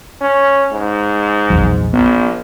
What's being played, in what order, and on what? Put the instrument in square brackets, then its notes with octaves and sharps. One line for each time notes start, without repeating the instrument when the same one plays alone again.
[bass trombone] C#4
G#2
[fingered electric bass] A#1 E2 F#3
[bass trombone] A#1 [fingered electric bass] B3